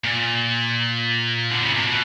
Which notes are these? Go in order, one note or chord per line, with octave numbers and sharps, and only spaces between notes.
A#2
D3
C#3
C3
B2